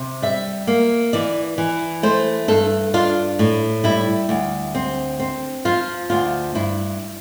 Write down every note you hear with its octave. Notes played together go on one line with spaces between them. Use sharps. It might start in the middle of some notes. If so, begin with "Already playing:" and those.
Already playing: C3
G3 E5
A#3
E3 D5
E3
A3 C5
G2 A4
D4 F4
A2
G3 E4
D2
C4
C4
F3 F4
D2 F4
G2 E4